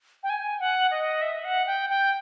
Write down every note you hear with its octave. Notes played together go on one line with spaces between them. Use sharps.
G5
G#5
F#5
D#5
E5
F#5
G5
G5